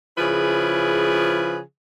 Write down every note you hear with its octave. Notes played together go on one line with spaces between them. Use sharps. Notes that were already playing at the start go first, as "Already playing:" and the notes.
C#3 F3 E4 G#4 B4